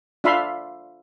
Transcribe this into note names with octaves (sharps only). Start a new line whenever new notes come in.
D4 F4 E5 F5 B5 C6